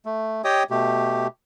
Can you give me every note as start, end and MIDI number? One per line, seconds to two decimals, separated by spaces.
0.06 0.42 57
0.44 0.63 67
0.44 0.63 73
0.44 0.63 75
0.44 0.63 79
0.44 0.63 87
0.71 1.27 47
0.71 1.27 57
0.71 1.27 67